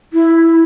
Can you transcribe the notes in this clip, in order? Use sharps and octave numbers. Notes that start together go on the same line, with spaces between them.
E4